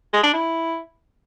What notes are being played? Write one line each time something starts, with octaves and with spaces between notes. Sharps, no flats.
G#3
D4
E4